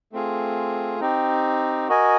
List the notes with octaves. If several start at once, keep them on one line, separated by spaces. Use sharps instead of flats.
A3 C4 F4 G#4
C4 D#4 G4
F#4 A#4 D#5 G#5